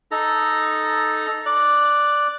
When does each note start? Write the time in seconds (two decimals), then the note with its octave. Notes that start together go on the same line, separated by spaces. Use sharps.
0.11 D#4 A4 A#5
1.46 D5 F#6